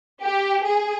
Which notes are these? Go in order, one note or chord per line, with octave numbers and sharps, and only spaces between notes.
G4
G#4